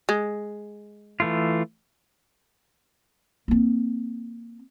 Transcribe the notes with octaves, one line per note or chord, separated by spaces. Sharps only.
G#3
E3 A3 F4
A#3 C4